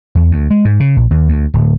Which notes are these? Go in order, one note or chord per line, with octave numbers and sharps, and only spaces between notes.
E2
D2
G#3
G#2
C#3
A#1
D#2
D2
D1